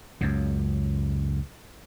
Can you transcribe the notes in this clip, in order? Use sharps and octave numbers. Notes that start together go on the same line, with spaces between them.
C#2 F#2 C#3